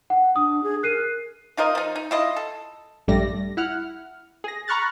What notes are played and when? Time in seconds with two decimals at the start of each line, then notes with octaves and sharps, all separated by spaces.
0.10 F#5
0.36 D4 D#6
0.64 G#4
0.83 A#4 F#6 C7 D#7
1.57 D#4 F4 A#4 D#5
1.75 F3 D#4
1.96 D#4
2.11 E4 F4 D#5
2.36 A4
3.08 A#1 G2 G3 A3 D5 A#6
3.57 E4 F#5 F6
4.44 G#4 A#6
4.68 A#5 B5 C#6 F6 F#6 A6